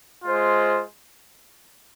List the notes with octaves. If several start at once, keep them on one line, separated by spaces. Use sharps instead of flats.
G#3 F4 C5